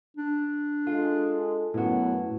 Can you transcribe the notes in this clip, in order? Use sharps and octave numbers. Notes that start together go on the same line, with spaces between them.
D4
G#3 F4 G#4 A4
F#2 A2 B3 E4 F#4